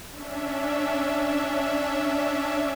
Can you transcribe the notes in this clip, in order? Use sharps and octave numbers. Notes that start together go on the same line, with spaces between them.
C#4 D4 E5